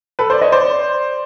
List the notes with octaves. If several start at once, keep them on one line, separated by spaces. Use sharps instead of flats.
A4 B4
C5 D5
C#5 D#5
C5 D5